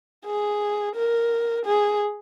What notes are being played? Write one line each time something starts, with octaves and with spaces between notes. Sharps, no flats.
G#4
A#4
G#4